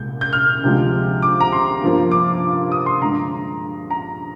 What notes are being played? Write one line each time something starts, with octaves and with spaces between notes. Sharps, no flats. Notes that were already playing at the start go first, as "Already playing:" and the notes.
Already playing: C2 A#2 G#3 G6
G6
F6
D2 C3 F3 G#3
D6
A#5
C6
G2 F3 A#3
D6
D#6
C6
G2 D3 G#3 A#5
A#5